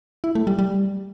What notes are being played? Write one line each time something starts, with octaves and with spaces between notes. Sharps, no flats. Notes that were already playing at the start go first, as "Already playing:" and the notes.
E4
A3
G3
G3